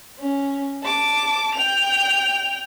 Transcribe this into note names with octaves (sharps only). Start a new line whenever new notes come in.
C#4
A5 D6
G5 F7